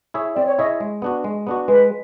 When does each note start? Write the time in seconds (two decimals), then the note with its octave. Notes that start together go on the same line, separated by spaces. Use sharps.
0.14 E4 G#4 C#5 E5
0.36 C4 D5
0.47 C#5
0.58 E4 G#4 C#5 D#5 E5
0.80 G#3
1.02 B3 D4 F#4
1.24 G#3
1.47 B3 D4 F#4
1.68 G#3 B4